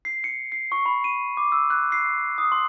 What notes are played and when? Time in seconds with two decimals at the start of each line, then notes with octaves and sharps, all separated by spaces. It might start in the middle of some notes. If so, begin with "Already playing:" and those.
0.05 C7
0.24 C#7
0.52 C7
0.72 C#6
0.86 B5
1.04 D#7
1.37 D6
1.52 E6
1.70 F#6
1.92 C7
2.38 D#6
2.52 C6